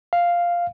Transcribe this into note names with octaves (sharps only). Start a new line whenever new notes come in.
F5